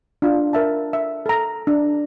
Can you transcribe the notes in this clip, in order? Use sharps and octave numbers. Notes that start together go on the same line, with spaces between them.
D4 F4
A#4 E5 A5
E5
A4 A#5
D4